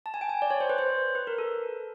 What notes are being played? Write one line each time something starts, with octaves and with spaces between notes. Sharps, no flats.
A5
G#5
G5
G#5
D5
C#5
C5
B4
C5
B4
A#4
A4